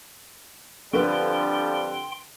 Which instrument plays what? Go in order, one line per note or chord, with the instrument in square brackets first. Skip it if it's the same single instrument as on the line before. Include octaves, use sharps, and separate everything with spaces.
[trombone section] F2 F3 G3 [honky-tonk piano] D3 B4 [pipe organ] G5 C6